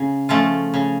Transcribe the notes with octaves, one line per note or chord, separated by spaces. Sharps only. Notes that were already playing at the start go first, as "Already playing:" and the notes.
Already playing: C#3
F3 A3 C#4 F4
C#3